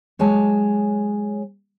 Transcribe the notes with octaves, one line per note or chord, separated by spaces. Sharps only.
F#3 G#3 C#5 G#5 A5